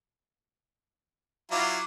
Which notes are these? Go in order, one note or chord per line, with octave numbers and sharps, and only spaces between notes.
F#3 E4 F4 D6